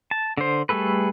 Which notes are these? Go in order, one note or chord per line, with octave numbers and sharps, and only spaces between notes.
A5
D3 C5
G3 A3 G#4 A4 B4